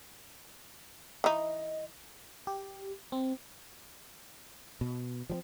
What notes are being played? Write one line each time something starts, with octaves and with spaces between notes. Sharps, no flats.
E3 D#4 D#5
G4
C4
B2
F3 F#3 C4